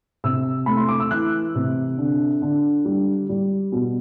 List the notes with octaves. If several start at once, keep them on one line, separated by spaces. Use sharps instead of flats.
C3 E6
A3 B5
C6
D6
E6
E3 F#6
C3
D3
D3
G3
G3
B2